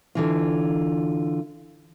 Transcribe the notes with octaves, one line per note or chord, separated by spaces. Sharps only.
D3 E3 F4